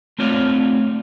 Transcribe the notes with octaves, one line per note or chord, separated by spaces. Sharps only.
A3 C4 F4 C#5 D5 F5